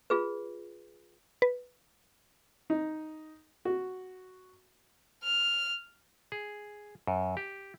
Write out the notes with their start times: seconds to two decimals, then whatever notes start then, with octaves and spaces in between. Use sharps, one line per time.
0.10 F4 G#4 B4
1.42 B4
2.70 D#4
3.65 F#4
5.23 F6
6.32 G#4
7.07 F#2
7.37 G4